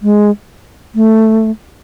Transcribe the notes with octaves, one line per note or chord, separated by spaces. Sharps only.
G#3
A3